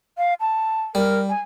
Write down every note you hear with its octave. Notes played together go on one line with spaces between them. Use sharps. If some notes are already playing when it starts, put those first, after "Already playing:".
F5
A5
G3 A#4
G#5